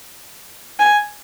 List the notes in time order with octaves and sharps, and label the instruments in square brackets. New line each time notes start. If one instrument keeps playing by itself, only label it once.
[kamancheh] G#5